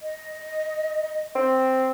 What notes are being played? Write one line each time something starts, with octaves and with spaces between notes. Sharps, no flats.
D#5
C4